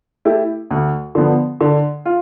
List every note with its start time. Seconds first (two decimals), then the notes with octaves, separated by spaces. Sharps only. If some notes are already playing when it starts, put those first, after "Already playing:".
0.25 A3 E4 G4
0.71 D2
1.15 D3 F3 B3
1.61 D3
2.05 F4